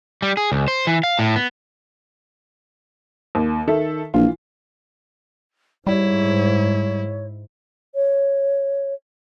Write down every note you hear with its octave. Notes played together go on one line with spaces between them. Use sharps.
G3
G#4
C#2
C5
E3
F5
A2
B3
D#2
D#3 A4 E5
A#1 E3 F4
G#2 G3 E4 C#5
C#5